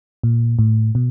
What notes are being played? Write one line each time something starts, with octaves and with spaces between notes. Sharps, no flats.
A#2
A2
B2